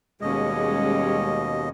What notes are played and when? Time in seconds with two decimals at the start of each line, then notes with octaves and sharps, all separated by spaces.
0.21 D#2 B2 G3 G#3 C#4 D#5